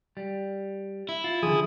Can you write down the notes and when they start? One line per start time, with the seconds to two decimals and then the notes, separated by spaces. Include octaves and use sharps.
0.17 G3
1.09 E4
1.24 F4
1.43 D3 D#3 F3 G#4 D#6